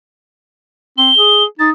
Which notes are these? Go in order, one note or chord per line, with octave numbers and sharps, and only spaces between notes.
C4 G7
G#4
D#4 A6